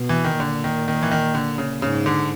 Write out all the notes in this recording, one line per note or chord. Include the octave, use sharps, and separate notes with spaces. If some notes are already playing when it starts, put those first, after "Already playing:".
Already playing: B2
E3
D#3
A#2 D3
D#3
D#3
E3
D#3
D3
C#3
G#2 C#3
D3